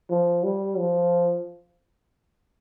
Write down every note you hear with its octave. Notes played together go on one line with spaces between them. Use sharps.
F3
G3
F3